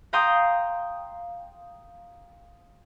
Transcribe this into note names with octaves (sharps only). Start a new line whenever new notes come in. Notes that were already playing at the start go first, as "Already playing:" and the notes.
F5 G5 A#5 C6 D#6 G6